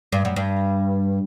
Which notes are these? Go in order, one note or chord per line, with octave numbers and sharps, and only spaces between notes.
G2
F#2
G2